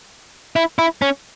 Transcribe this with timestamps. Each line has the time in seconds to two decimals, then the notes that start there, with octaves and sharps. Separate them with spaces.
0.56 E4
0.79 E4
1.02 C#4